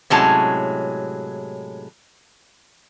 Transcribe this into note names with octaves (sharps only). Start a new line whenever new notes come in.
A2 C3 F#3 G#3 C#4 A5